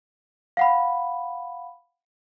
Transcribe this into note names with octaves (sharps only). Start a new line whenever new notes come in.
F5 F#5 B5